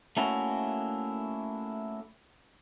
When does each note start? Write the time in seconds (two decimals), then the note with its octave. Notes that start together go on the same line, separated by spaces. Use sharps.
0.17 A3 A#3 C#4 D4 E4 F#4